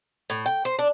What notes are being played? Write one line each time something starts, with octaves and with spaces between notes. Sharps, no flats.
A2
G5
C5
D4